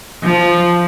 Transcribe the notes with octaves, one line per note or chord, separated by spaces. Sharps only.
F3